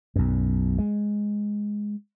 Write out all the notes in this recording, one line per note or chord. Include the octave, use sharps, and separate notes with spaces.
B1 F#2
G#3